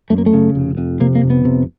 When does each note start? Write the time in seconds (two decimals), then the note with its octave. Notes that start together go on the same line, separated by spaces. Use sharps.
0.10 F#2 A3
0.18 A#3
0.26 A3
0.34 C#3
0.55 F1
0.77 F2
1.00 C3 A#3
1.15 A#3
1.23 F1
1.30 B3
1.45 C3